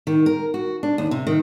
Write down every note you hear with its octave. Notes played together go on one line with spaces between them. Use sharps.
D#3
A#4
F#4
D4
D#2
C3
D#3